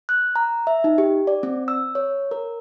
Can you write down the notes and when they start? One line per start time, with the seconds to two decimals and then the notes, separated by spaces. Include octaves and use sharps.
0.09 F#6
0.36 A#5
0.67 E5
0.84 D#4
0.98 G4
1.27 D5
1.43 C4
1.68 E6
1.95 C#5
2.31 A#4